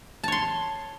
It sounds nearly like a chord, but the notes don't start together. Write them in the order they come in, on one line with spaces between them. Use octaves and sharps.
A5 C#5 C6